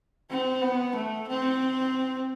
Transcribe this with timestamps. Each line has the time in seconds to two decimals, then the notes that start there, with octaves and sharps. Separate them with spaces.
0.30 C4
0.62 B3
0.96 A3
1.29 C4